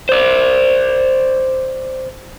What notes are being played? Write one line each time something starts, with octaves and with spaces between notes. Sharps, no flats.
C5 D5